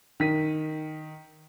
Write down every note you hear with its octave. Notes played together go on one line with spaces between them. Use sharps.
D#3 B6 D#7